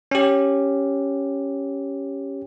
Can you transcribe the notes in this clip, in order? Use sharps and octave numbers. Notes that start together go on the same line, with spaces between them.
C#4 G4